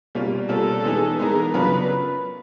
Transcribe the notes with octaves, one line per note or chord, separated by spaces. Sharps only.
B2 G3 A#3 C#4 F4
B2 G3 A#3 C#4 F4 A4
E3 G#3 B3 D#4 G#4
E3 G#3 B3 D#4 G#4 A#4
C#3 F#3 B3 D4 F4 B4